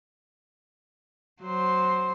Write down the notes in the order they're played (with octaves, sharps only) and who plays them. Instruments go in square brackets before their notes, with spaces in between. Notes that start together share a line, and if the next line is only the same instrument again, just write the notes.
[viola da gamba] F#3 C5